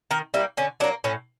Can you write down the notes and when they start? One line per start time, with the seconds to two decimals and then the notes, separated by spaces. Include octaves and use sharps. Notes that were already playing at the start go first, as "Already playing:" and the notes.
0.11 D#3 A#4
0.34 G3 A#3 E4
0.57 D3 C#4
0.80 F#3 D4
0.84 A#3
1.04 A2 C#4